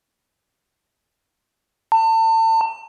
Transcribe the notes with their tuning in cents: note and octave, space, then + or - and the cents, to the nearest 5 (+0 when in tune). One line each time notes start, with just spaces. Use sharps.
A5 +35